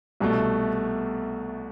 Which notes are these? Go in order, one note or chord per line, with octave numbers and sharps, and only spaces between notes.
C2 B2 A3